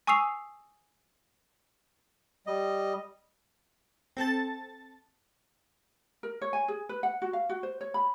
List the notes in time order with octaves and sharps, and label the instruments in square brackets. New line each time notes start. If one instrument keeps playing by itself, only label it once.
[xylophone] G#5 C#6 D#6 E6 C7 F7
[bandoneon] G3 D#5
[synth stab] C4 A4 A5 A6
[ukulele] A#4
C#5
G#5
G#4
B4
F#5
F#4
F5
F#4
C5
C#5
B5